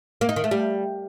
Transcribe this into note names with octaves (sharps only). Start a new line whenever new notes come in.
A#3
D#4
D#3
A3
G3